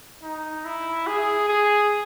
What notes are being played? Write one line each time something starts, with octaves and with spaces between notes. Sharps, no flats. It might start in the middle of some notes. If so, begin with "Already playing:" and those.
D#4
E4
G#4
G#4